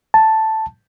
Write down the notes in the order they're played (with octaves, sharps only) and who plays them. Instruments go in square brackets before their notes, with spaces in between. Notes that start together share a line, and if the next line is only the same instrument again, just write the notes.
[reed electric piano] A5